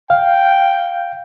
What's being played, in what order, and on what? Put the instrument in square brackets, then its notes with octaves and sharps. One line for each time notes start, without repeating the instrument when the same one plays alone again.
[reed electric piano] F5 [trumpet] G5